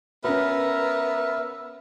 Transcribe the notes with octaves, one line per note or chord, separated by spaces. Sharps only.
B3 C#4 A#4 B4 E5 E6 F6